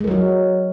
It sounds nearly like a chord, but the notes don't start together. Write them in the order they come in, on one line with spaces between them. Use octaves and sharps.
G#3 A#4 F#3 F#4